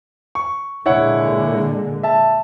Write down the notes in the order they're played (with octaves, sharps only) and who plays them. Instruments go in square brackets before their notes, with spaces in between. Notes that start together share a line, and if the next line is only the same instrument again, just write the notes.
[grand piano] C#6
[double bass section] A#2 D3 G#3 [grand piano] E4 C#5 F#5
[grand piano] E5 A5